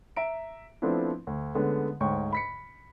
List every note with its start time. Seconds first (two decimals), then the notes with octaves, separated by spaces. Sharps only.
0.16 E5 A#5 D7
0.82 F3 A3 B3 C4 D4 E4
1.27 D2
1.55 D3 G#3 A3 B3 C#4
2.00 D2 G#2 C#5 G5 C#6
2.33 B5 B6 C#7